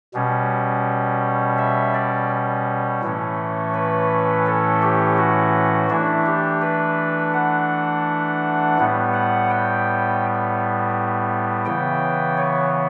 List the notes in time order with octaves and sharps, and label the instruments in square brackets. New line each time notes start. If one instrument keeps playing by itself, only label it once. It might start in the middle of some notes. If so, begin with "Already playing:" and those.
[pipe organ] B2 G3 C#4
E5
D5
A2 E3 A3 C#4
B4
A4
G4
F#4
E3 A3 D4 E4
G4
B4
F#5
A2 G3 B3
F#5
G5
C#3 E3 B3 G5
C#5